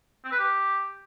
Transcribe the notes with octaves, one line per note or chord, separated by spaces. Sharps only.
C4
B4
G4